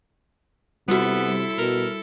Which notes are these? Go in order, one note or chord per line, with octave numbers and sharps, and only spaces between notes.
C3 G3 B3 E4 F#4 A4
B2 A#4